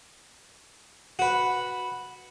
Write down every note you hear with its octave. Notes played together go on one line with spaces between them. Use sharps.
F#4 B4